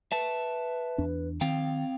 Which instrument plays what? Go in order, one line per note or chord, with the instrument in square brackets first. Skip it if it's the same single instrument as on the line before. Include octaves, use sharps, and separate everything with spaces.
[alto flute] B4 [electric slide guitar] E5 A5
[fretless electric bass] E2 D4
[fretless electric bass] D#3 [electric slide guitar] C4 F5 G5